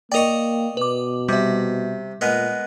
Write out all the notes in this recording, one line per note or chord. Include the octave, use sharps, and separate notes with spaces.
A#3 A#4 D5 D#5 G5 C#6
B2 B4 D6
C3 G3 E5
A#2 G#3 B3 A#4